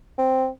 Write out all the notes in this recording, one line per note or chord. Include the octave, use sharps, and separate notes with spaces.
C4